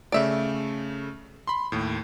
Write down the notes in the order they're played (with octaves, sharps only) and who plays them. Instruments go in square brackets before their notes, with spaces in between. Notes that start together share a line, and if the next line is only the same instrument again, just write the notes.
[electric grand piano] C#3 A3 D7 [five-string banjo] D5 E5
[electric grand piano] B5 C6
D#2 A2